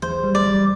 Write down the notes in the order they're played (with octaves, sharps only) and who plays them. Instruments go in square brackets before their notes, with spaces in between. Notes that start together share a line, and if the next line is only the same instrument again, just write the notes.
[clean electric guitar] E2 [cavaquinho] C5
[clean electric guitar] G3
[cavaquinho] D5
[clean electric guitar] G3